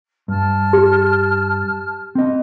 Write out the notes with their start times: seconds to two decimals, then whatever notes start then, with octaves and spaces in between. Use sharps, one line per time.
0.28 G2 A5 F6
0.73 G4
2.15 C4 D#5